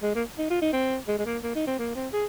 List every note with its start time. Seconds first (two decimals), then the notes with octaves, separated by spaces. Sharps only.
0.03 G#3
0.15 A#3
0.38 D#4
0.50 F4
0.62 D#4
0.73 C4
1.08 G#3
1.19 G#3
1.26 A#3
1.43 A#3
1.55 D#4
1.67 C4
1.79 A#3
1.95 C4
2.13 G#4